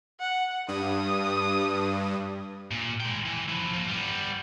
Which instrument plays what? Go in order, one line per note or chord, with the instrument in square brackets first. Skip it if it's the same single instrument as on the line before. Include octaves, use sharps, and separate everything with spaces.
[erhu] F#5
[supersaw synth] G2 [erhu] D#6
[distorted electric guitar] A#2
G#3 G5
E3
F3 E4
F3 A#3
G3 B3